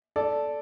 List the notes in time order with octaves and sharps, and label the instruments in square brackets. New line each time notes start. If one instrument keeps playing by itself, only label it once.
[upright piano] A4 D5